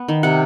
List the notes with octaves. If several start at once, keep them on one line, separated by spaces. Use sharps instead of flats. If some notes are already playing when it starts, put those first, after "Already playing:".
Already playing: B3
D#3
C3 F#5